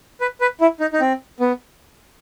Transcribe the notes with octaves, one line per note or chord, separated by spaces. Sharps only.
B4
B4
E4
D#4
D#4
C4
B3